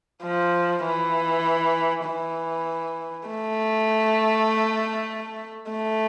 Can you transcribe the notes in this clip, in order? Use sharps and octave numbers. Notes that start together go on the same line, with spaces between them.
F3
E3
E3
A3
A3